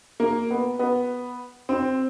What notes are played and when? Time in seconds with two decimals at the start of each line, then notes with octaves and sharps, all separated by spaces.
0.20 A#3
0.51 B3
0.79 B3
1.69 C4